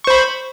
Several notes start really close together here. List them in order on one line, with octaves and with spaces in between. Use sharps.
C#6 C5 B5